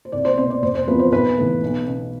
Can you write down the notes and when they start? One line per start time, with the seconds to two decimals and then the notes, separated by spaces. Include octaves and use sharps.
0.05 C5
0.12 C2 D5
0.25 C5
0.38 B2 C5
0.50 D5
0.62 F1 C5
0.75 C5
0.87 E2 C3 F3 B4
0.99 C5
1.12 B1 B4
1.38 A2 E3
1.63 B1
1.88 B2